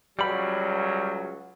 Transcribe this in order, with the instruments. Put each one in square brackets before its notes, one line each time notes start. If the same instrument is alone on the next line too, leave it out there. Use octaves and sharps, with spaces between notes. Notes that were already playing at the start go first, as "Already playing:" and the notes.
[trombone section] C#2 F#3 [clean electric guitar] G3 B5